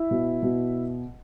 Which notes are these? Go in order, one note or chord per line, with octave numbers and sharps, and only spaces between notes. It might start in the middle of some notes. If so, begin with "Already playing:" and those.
Already playing: E4 E5
B2
B2